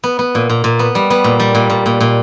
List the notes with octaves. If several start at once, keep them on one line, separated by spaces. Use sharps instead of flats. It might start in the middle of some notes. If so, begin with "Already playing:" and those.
B3
B3
A#2
A#2
A#2
B3
G3
B3
A#2
G3
A#2
A#2
A#2
A#2